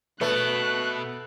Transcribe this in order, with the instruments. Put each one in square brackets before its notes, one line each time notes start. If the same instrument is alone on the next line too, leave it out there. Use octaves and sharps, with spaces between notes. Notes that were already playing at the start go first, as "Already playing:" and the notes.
[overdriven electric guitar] B2 B3 [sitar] A3 [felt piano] B4 [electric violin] F#6